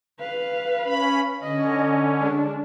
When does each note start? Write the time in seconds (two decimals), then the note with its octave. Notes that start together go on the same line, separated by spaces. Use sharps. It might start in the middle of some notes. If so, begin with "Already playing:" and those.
0.20 B4 F5
0.83 C#4 B5
1.43 D3 C#4 D#5
2.20 G#3 D4